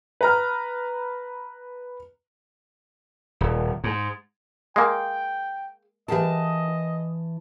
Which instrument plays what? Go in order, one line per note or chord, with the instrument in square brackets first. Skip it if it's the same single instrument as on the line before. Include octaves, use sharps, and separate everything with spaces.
[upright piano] B4 A#5 F6
[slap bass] D#1
G#2
[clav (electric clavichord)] G#3 A#3 [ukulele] G#4 F5 [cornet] G5
[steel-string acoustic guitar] E3 A5 [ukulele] G4 G#4 A#4 [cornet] D#5